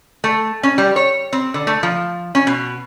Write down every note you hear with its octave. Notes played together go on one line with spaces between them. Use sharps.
A3
C#4
G3
C#5
C4
D3
A3
F3
C#4
B2